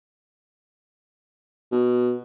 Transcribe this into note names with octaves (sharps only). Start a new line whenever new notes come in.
B2